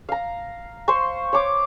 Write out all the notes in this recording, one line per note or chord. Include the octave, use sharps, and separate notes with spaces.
F5 A#5
C5 C6 C#6
C#5 D6